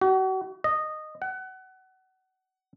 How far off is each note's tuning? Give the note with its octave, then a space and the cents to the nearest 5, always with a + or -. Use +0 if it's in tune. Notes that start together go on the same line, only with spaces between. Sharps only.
F#4 +40
D#5 -15
F#5 +25